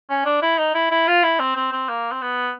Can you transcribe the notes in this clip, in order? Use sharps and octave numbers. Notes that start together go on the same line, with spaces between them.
C#4
D4
E4
D#4
E4
E4
F4
E4
C4
C4
C4
A#3
C4
B3